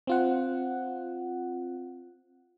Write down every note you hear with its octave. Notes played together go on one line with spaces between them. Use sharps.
C4 F4 F#5